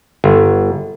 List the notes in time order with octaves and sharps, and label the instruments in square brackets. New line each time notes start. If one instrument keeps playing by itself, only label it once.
[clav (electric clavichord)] G1